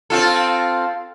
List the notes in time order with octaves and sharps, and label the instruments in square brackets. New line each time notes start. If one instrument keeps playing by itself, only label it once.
[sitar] C4 F4 A4